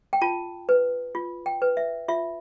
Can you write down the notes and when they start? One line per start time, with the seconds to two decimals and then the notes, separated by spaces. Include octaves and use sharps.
0.13 G5
0.21 F4 A5
0.69 B4
1.15 F4
1.46 G5
1.62 B4
1.77 E5
2.08 F4 E5